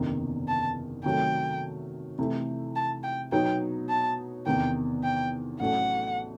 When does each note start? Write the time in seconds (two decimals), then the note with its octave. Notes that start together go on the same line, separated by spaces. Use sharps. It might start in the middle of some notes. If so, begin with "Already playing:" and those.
Already playing: F#1 E2 C3 D#3
0.48 A5
1.05 C3 D#3 F#3 A3 G5
2.18 C3 E3 A3 E4
2.76 A5
3.03 G5
3.32 B2 F#3 B3 D#4 G5
3.89 A5
4.46 E2 C3 D#3 G5
5.04 G5
5.60 A1 A2 F#3 A3 F#5